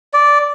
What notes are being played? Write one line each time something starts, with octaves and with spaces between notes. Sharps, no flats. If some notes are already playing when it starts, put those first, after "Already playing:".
D5